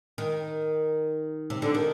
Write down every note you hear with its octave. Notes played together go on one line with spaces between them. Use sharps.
D#3
C3
D3
D#3